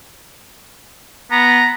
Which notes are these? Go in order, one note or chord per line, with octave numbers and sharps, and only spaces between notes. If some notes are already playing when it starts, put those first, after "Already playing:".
B3 A#5